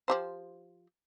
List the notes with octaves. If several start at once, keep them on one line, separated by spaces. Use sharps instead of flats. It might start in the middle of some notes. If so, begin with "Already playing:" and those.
F3 G4 C5